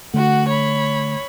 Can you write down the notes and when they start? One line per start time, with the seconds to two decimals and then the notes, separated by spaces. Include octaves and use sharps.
0.14 D3 A3 F#4 F#5
0.48 C#5 B5